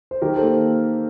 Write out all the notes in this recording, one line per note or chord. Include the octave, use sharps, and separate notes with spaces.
C5
D#3 G4 A#4
A#3 A4 C5